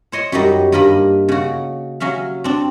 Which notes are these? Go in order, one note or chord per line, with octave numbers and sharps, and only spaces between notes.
C5 C#5 D#5 C6
F#2 F#3 G3 D#4
G2 A#3 A#4 D#5 B5
C#3 F#4
F#3 C#4 E5 F5
C4 D4